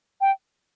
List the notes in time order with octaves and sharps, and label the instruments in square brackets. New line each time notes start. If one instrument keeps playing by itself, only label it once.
[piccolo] G5